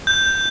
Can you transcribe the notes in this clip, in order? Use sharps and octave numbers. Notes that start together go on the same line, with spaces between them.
G6